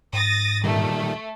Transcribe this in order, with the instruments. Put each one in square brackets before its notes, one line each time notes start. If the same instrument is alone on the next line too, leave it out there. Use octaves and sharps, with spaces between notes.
[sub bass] G#2 [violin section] D#6 A6 A#6
[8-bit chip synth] A#2 D#3 G3 [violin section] A3